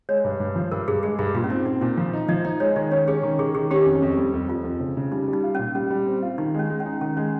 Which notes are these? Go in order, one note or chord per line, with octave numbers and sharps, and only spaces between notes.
G#3 C#5
G2
G2
F3
G2 A#4
G2 G#4
G#3 G#4
G2 G#4
A#2 F4
C#4
C4 D#4
C4 D#4
A#2 D#4
F3 F4
D#4
F3 D#5
D#4 D#5
G#3 C#5
D#3 D#5
C#4 C#5
C#4 G#4
D#3
D#3 G#4
D#3 G#4
C#4 G4
F2 D#4
F2
G3
F2
F2 F4
F2
C#3
C#3
G3 D#4
G3
D#4
F4
C#4
A#2
G3 C#4
G3
C4
F4
D#3 D#4
G#3 C#4
G#3
C#4
D#4
D#3 C#4
G#3 C#4